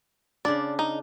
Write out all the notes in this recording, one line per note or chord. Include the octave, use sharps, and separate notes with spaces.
C#3 D4 D5
D#4